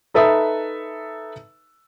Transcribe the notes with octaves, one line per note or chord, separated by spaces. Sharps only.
D#4 A4 B4 E5 B5 D#6